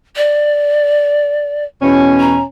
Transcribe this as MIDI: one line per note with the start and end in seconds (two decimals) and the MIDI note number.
0.16 1.64 74
1.82 2.42 40
1.82 2.42 47
1.82 2.42 61
2.19 2.42 82